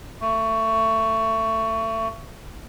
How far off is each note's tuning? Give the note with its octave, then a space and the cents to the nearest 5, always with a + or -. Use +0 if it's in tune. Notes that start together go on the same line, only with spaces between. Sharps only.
A3 +25